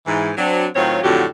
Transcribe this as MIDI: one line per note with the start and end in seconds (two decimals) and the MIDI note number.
0.07 0.31 44
0.07 0.31 52
0.37 0.67 54
0.37 0.67 60
0.37 0.67 62
0.76 0.99 45
0.76 0.99 51
0.76 0.99 54
0.76 0.99 60
0.76 0.99 65
0.76 0.99 73
1.04 1.25 41
1.04 1.25 45
1.04 1.25 50
1.04 1.25 54
1.04 1.25 66
1.04 1.25 67